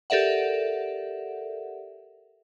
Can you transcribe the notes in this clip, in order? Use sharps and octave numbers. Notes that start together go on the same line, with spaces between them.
G4 A4 A#4 D5 E5 F#5